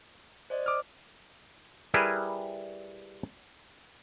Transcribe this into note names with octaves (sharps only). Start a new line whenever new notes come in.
C5 D5 D#5
D6 D#6 F6
G3 E4 G#4 A#4 B4